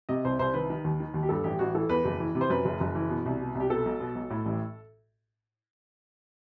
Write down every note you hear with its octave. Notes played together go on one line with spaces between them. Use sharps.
C3 D#5
C2 C5
C2 C5
D#3 B4
D#3
D#2
D#3
D#2
G4
G2 A4
A1 G4
A1 F#4
E3 A4
E2 B4
F#1
E3
C3
C5
F#2 B4
F#1
F#1
E3
B2
C2
B2
C2
G4
B2 A4
B1
B2
B1
A2
A1